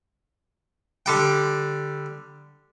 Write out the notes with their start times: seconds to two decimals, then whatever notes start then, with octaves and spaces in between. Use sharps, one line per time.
1.06 D3 G3 G5